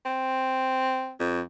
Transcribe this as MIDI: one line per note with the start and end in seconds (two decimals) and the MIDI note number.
0.06 1.12 60
1.20 1.41 41